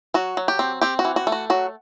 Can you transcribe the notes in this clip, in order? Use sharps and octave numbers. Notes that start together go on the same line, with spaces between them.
F#3 F#4
F#3
G4
C4
C4 G4
F#4
E3
F#4
A3
F#4
F#3 F#4